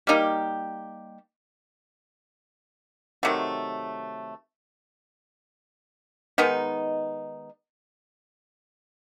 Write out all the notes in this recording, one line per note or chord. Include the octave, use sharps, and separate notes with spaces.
G3 A#3 D#4 G4
C3 D#3 F#3 A3
D#3 G#3 B3 D#4